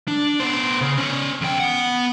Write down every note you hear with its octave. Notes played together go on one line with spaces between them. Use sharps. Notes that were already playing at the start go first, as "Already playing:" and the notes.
D4
B3 C5
C#3
C#4 C5
E2 G5
B3 F#5